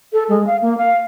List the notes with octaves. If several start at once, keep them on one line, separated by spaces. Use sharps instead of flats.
A4
G#3
F5
A#3
F5